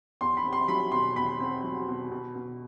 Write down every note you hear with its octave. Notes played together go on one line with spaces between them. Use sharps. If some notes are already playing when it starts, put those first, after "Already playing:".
E2 C6
B5
C4
C6
F#3 B5
B2 C6
E2 B5
C4
F#3
B2
B2
B2